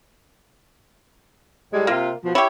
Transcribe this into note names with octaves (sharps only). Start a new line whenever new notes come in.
A2 G3 G#3
C3 A#3 F4
B2 F3
E4 G4 C#5